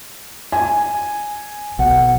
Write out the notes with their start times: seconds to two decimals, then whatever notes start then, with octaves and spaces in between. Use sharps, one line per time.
0.52 G#5
1.79 B1 F#5